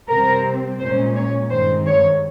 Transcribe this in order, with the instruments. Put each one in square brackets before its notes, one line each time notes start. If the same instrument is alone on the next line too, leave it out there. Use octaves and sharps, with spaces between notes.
[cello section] C3 G3 C4 A#4
A#2 G#3 C#4 C5
C#5
G2 D#3 G#3 C4 C5
C#5